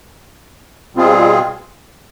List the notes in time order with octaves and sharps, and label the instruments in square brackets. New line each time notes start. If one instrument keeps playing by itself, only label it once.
[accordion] B2 G3 C4 F4 G#4